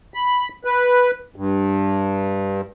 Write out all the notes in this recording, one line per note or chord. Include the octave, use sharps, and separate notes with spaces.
B5
B4
G2